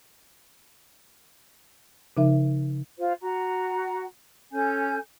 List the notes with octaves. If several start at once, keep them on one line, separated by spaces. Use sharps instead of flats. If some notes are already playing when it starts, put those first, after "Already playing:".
C#3 F3 D#4 A#4 E5
F4 C5
F#4 F#5 A#5
C#4 A4 G#5 G6